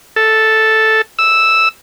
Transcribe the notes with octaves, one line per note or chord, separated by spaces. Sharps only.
A4
E6